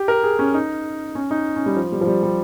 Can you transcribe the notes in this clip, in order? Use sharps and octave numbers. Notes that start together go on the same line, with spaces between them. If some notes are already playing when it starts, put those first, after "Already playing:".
Already playing: G4
A#4
G#4
C#4
D#4
C#4
D#4
C#4
G3
F3
G3
F3
G3
G3